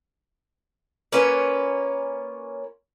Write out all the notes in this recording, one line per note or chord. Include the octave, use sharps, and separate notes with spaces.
A#3 C#4 F4 B4